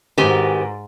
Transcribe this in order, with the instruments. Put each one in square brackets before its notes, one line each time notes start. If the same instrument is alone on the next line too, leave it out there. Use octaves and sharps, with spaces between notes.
[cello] G#2 [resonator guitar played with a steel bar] D#3 G4 G#5 [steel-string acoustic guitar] C4 F#4 B4